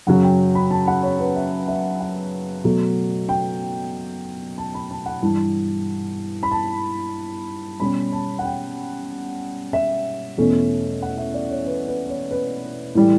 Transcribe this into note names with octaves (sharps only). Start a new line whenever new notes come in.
F#2 C#3 F#3 C#4 F#5
G5
B5
A5
F#5
C#5
B4
E5
E5
F#5
B2 F#3 A3
G5
A5
B5
A5
F#5
G2 E3 G3 A5
B5
A5
B2 G3 C#4 B5
A5
F#5
G5
E5
E2 B2 A3 C#4
F#5
E5
D5
C#5
B4
B4
C#5
B4
A2 E3 G3